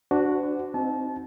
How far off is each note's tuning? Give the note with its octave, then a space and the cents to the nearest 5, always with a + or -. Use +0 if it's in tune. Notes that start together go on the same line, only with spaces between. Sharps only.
D4 -5 F#4 +0 C5 -40
C4 +0 D#4 +0 A5 -30